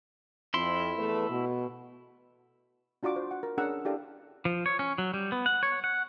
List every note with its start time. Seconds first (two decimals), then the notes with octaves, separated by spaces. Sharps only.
0.54 F2 E4 C6
0.96 E2 A3 B4
1.29 B2
3.03 D4 F4 F#4 D5 D6
3.16 C5
3.31 F#5
3.43 A#4
3.58 C#4 D4 G#4 A#4 F#5 E6
3.85 D4 E4 G4 A4 D5 F5
4.45 F3
4.66 C#5
4.79 C#4
4.98 F#3
5.14 G3
5.32 B3
5.46 F#5
5.63 C#5
5.84 F#5